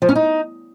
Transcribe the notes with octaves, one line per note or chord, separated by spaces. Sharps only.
F3
C#4
D#4